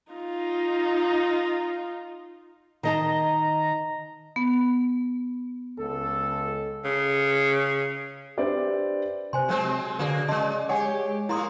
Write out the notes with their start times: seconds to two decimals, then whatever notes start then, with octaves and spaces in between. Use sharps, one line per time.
0.12 D#4 F4
2.83 D#3 D#5 A5 A#5
4.36 B3
5.79 C#2 A4
6.85 C#3
8.37 D4 G4 B4 C5 D5 E5
9.33 C3 C5 G#5 C6
9.48 F#3 G#3 C4
9.99 D3 A#3 F#4 G#4 B4 D5
10.28 C#3 G#3 D5 D#5 A5 C6
10.69 G#3 G4 C#5 F#5 G#5
11.29 A#2 A#3 E4 C6 D#6